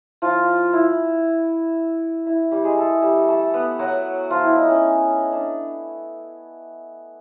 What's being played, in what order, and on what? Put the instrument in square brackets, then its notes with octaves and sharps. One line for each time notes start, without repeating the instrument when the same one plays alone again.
[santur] F3 F4
E4
E4
G3 G4
G#3 G#4
A3 A4
G3 G4
A3 A4
B3 B4
F#3 F#4
F3 F4
E4
D#4
C#4
D4